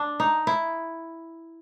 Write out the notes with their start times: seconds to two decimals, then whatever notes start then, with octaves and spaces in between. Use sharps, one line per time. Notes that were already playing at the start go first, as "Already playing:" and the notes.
Already playing: D4
0.20 D#4
0.47 E4